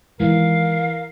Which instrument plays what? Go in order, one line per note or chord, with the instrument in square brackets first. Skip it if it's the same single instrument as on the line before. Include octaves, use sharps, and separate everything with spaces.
[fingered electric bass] D#3 G#3 [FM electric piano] E3 [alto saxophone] A#4 [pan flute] F5